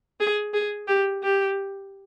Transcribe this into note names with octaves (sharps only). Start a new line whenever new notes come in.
G#4
G#4
G4
G4